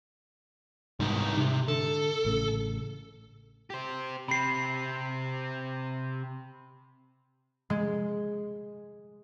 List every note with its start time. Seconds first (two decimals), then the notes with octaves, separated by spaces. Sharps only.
1.00 C2 G#2 D#4
1.37 C3
1.68 D3 A4
2.25 A1 A2 C#3
3.70 G4 C5
4.28 C3 C4 B5 C7
7.70 G#3